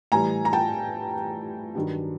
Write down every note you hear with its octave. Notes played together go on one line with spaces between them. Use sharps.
A2 E3 G3 G#5 A#5
A#5
G5 A5
G2 D#3 F#3